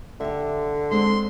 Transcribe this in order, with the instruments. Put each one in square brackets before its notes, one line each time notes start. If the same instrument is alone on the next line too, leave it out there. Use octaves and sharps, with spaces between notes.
[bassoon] D3 [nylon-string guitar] G4 E5
[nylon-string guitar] G#3 C4 D4 [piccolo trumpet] C6